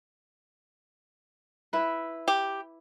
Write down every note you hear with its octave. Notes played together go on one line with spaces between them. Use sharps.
E4 B4
G4